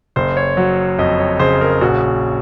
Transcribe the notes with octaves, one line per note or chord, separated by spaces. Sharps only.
F#1 C5
C#5
F#3
F2 D#5
C#5
C#3 C5
A#4
A#1 F#4